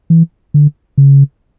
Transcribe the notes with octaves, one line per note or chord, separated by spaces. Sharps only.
E3
D3
C#3